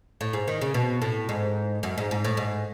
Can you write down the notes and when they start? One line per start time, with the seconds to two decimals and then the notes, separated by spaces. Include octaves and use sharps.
0.21 A2
0.33 G#2
0.48 D#3
0.61 C#3
0.74 B2
1.02 A2
1.29 G#2
1.83 F#2
1.98 G#2
2.11 G#2
2.25 A2
2.37 G#2